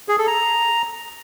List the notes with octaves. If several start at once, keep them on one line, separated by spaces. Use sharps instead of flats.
G#4
A4
A#5